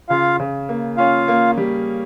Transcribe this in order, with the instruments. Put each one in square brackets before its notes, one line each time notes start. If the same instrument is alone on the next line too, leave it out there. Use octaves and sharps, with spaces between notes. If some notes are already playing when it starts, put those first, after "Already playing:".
[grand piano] C#3 [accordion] F4 F5
[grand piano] C#3
A#3
[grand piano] C#4 [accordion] F4 F5
[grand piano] A#3
G3